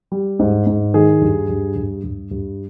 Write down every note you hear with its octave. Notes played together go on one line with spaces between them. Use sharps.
G3
G#2
G#2
D#3 G#4
G2
G2
G2
G2
G2